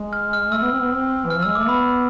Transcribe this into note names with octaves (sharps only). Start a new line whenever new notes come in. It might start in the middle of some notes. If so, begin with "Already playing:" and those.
Already playing: G#3
F6
F6
A3 E6
B3
C4
B3
C4
E3 F6
F3
E6
G#3
A3 D6
B3 B5